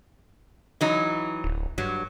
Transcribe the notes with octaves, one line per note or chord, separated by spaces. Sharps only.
E3 F#3 D#4
D1
G2 F#3